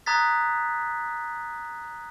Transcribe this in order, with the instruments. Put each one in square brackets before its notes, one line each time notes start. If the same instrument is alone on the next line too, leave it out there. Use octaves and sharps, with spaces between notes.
[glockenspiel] A#5 D#6 F#6 G#6 A6 B6